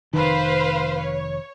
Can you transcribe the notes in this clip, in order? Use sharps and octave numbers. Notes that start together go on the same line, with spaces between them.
F1 A#1 D#3 B4 C5 F5
C#5